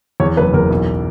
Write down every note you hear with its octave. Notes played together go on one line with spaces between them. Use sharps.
E2 C#5
F#1 B4
E2 A#4
B1